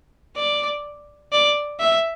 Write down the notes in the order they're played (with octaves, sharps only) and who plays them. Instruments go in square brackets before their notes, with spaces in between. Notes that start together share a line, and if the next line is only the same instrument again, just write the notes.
[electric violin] D5
D5
E5